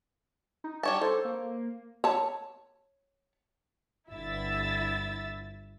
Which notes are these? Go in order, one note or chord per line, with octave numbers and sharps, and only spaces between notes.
D#4
G3 C#5 A5
A4 C5
A#3
C#5 A5
G1 E4 E5 E6 A6